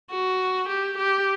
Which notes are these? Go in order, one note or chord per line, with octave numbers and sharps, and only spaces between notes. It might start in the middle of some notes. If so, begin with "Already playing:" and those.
F#4
G4
G4